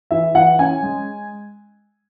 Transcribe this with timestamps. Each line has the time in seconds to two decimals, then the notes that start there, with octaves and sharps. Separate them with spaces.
0.11 E3 E5
0.35 E3 F#5
0.59 C#4 G#5
0.83 G#3